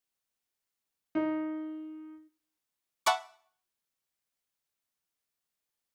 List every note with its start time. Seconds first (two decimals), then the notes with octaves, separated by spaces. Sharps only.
1.15 D#4
3.06 E5 F#5 A5 B5 C#6 D6